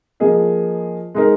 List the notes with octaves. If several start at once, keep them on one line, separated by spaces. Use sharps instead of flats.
F3 A#3 G#4 D#5
G#3 D#4 A#4